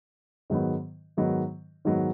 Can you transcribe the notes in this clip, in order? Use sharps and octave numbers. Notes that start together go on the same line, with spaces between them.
G#2 D#3 F#3 B3
G#2 D#3 F#3 B3
G#2 D#3 F#3 B3